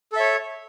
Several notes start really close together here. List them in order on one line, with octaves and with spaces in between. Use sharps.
A4 E5 C#5